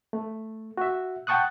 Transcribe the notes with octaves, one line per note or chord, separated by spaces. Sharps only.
A3
F#4 E5
F#5 G5 A5 C#6 D#6 F#6